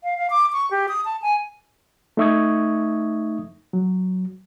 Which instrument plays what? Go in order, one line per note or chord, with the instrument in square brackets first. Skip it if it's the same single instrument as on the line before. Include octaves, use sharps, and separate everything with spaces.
[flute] F5
F5
D6
C#6
G4
D#6
A5
G#5
[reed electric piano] A3 D#4 E5 C#6 D#6 G#6
F#3